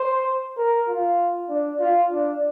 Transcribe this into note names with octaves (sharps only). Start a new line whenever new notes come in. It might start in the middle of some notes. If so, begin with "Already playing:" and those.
Already playing: C5
A#4
F4
D4
F4
D4